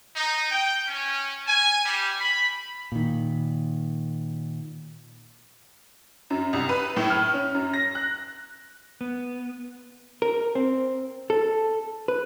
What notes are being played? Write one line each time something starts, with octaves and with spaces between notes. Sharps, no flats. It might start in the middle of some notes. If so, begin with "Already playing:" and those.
D#4
G5
C#4
G#5
G3
B5
A#2 D#3
F#2
C2
B4
A2
F6
C#4
F#2
A#6
F#6
B3
A#4
C4
A4
B4